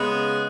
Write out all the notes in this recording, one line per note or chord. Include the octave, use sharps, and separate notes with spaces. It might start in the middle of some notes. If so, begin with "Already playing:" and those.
Already playing: C#3 G#3 B3